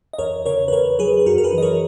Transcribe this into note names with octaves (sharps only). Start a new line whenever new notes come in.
D#5
E2 A#4 C#5
C#3 A#4 C#5
B4
E2 A#4 C#5
F#3 G#4 B4
B4
F#2 F#4 A#4
A#4
G#4 B4
E3
D#5
A#4 C#5